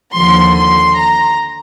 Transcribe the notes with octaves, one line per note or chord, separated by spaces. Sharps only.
D#2 D3 F3 C6
C6
A#5